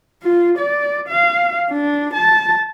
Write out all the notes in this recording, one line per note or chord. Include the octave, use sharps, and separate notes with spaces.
F4
D5
F5
D4
A5